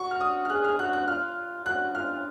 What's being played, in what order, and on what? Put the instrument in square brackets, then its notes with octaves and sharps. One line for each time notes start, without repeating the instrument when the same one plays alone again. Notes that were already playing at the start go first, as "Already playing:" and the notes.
Already playing: [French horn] F#4 [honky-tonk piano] C#6
[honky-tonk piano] F6
D#6
F6
[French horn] G#4 [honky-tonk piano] F#6
[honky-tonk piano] F6
[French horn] F#4 [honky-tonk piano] F#6
[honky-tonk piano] F#6
[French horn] F4 [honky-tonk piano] F6
[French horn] F#4 [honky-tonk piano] F#6
[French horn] F4 [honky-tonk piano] F6